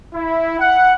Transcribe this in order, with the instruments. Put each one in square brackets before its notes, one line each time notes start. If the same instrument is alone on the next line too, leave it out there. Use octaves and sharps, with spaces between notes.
[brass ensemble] E4
F#5